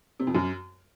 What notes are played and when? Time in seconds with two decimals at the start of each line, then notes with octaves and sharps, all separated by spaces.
0.20 C3
0.27 F2
0.35 F#2